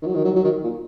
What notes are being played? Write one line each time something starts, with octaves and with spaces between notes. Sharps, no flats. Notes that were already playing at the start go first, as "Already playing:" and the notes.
D#3
F#3
D#3
F#3
F#3
D#3
A#2